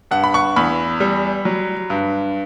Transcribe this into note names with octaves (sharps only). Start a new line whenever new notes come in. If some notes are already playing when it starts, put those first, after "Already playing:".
G2 F#5
B5
C#6
E2 B5
G3
F#3
G2